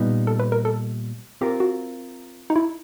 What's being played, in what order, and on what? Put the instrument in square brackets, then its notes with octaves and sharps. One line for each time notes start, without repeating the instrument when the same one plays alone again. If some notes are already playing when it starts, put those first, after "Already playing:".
Already playing: [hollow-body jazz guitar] A#2 G3 B3 D#4
[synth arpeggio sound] A4
B4
A#4
A4
[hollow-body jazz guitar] C4 F4 A#4 [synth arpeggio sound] G4
[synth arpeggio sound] F#4
D#4
E4